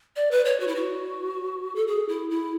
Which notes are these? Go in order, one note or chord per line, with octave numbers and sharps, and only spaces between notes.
D5
B4
C#5
F#4
E4
F#4
A4
G#4
E4
E4